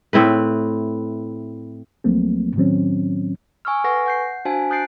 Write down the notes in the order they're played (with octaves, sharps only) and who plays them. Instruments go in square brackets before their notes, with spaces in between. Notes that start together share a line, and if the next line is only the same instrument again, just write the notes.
[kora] A2 C4 E4 B4
[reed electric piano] D2 F3 F#3 A3 A#3 C4
A2 D#3 F#3 C4 C#4
[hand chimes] G#5 C#6 E6 F6
A4 B4 F#5 G#5 C#6 A#6
F#5 G6 C7
D4 F#4 C5 F5 G#5 A5
D#6 F#6 G6 A6 C7 D7